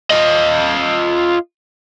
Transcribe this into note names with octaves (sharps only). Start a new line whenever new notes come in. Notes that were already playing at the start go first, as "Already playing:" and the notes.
F4 D#5